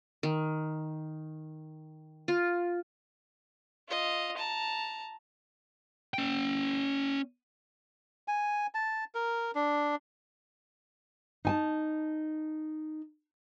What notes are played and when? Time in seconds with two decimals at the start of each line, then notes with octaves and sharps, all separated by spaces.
0.23 D#3
2.28 F4
3.89 F4 D#5
4.37 A5 A#5
6.14 C#4 G5
8.28 G#5
8.74 A5
9.15 A#4
9.55 D4
11.45 D#4 G#5 A5